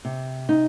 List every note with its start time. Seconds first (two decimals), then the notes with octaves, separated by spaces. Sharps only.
0.05 C3
0.49 D#4